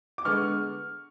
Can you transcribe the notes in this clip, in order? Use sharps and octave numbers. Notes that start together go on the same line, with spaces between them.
D6
D3 G#3 B3 C#6 F6